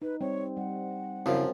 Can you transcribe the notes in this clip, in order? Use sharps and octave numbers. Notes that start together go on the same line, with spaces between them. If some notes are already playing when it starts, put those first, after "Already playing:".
D#4 B4
G3 C4 C#5
G3 F#5
F#2 C#3 F3 C4 E4 F5